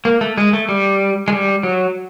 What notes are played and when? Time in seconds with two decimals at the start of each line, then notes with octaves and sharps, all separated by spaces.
0.05 A#3
0.21 A3
0.38 G#3
0.53 A3
0.69 G3
1.28 G#3
1.33 G3
1.63 F#3